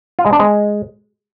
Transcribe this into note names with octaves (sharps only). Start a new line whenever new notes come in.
F4
G#3
D4
G#3